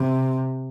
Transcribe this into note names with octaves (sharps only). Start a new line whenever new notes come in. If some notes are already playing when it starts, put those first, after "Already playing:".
Already playing: C3